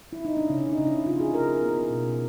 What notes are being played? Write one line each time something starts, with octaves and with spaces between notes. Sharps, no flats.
E4
D#4
D4
C#3 C#4
D#4
C#3
E4
C#3 F4
G#4
C#3 A#4
B3
B2